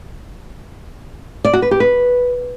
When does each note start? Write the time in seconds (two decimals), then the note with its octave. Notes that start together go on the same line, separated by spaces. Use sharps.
1.45 D5
1.53 F#4
1.62 B4
1.71 G4
1.80 B4